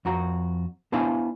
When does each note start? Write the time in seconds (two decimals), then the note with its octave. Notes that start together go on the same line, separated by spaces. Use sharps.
0.05 F2 F#4 A#5
0.92 B3 D4 E4 C5 F5 G#5